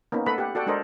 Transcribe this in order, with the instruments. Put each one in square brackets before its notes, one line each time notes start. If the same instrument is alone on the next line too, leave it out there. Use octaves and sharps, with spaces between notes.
[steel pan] A#3 B3 C#4 D#4
A3 A4 B4 D#5 F#5 B5
G4 F#5
F#4 A4 D5 F#5 G5
G#3 D4 A4 A#4 C5 D#5